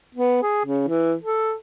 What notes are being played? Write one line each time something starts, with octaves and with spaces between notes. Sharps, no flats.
B3
G#4
C#3
E3
A4